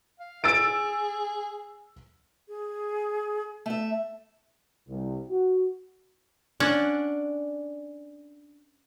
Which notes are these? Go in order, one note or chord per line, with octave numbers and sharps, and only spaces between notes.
F5
G#4 E6 A6 D7
G#4
A3 E5
C2
F#4
C#4 D4 D5 F#5